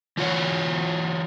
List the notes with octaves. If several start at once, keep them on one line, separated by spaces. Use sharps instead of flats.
E3 F4 F#4 C#5